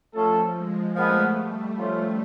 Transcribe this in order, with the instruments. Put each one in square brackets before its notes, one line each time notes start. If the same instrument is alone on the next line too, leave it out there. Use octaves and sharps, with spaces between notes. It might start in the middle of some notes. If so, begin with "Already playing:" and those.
[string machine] F3 [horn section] A3 C#4 F4 A4
[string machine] G#3
[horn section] A#2 F3 G#3 B3 [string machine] A3
[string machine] G3
[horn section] F3 A3 C#4 F4